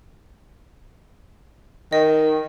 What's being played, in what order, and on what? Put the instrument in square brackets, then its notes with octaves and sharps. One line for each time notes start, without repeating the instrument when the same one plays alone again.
[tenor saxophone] D#3 [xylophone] D#5